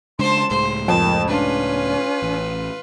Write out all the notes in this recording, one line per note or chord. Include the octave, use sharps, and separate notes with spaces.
C#3 G#3 D4 C5 A5 C6
C#2 A2 G#3 C5
F2 A#4 A5
C#4 D4 F4 B4
A1